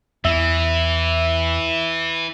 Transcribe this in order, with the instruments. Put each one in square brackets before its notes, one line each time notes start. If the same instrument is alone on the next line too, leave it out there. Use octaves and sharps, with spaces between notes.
[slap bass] E2 [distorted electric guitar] E3 [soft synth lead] E5